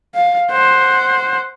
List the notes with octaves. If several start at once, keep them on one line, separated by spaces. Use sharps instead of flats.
F5
C5 F#5